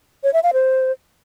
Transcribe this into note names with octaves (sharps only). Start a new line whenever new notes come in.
C#5
E5
F5
C5